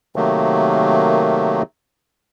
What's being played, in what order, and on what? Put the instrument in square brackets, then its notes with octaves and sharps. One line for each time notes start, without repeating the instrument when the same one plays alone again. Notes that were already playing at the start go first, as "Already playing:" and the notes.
[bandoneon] C3 D#3 F#3 A3 A#3